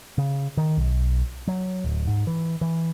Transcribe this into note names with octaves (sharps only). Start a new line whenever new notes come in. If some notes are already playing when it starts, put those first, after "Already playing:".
C#3
D#3
B1
F#3
D1
G#2
E3
E3